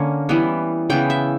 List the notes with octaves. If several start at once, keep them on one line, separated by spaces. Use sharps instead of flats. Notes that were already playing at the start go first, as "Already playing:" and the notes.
Already playing: D3 A#3 C#4
E3 G3 B3
C#3 E3 B3 G5
E5